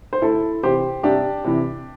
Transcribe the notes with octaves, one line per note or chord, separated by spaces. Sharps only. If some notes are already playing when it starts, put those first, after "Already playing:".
C5
D2 E4 A4
C3 E3 G4 C5
C2 D4 G4
C3 E3